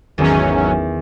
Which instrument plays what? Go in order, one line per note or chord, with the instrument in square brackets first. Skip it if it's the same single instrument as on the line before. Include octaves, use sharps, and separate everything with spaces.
[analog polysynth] G#1 F#3 C#4 [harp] E2 D#3